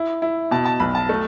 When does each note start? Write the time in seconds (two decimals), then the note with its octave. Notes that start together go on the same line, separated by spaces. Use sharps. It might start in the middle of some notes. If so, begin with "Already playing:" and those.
Already playing: E4
0.22 E4
0.51 B2 A5
0.65 A5
0.80 B1 B5
0.95 A5
1.09 A3